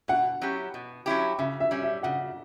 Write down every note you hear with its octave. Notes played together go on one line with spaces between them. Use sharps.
B2 F#5
F#3 C#4 E4 G4
B2
F#3 C#4 E4 G4
C#3 E5
E5
G3 C#4
E5
C#3 F#5